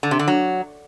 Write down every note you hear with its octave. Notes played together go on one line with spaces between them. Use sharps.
D3
C3
D3
F#3